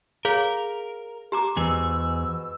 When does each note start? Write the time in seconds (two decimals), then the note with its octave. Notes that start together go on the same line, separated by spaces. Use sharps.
0.25 G#4 A#4 C#5 F5
1.32 G4 A#5 D6
1.57 E2 G#2 B2 G#4 E6